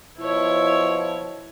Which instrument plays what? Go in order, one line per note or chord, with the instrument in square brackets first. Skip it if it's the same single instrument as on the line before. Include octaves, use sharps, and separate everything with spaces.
[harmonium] B2 F3 [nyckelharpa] E4 C#5